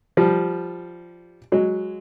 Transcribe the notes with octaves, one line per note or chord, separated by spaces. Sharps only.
F3 G3
F#3 G#3